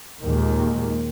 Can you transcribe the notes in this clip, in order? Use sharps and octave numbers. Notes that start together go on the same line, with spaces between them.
D#2 A#2 D#3 G#3